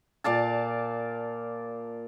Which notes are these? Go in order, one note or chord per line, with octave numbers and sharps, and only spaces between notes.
A#2 D5 F5 A5